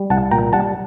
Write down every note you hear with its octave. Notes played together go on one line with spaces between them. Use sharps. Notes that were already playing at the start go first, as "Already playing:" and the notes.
Already playing: G3
C2 F#5 A5
A#2 G5 A#5
G3 F#5 A5